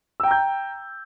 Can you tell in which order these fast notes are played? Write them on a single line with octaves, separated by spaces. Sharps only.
E6 G5 A#5 G6